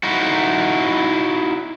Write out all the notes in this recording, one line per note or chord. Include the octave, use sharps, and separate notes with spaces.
D#4 E4 F#4